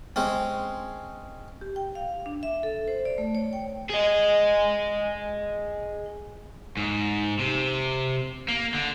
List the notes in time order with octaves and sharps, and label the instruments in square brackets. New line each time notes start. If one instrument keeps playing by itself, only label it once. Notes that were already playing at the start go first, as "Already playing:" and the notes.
[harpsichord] G#3 C4 C#4
[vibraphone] G4
G5
F5
D4
E5
A4
C5
D5
A3
C#5
G5
[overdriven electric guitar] G#4 D#5
G#2
C3
A#3
D3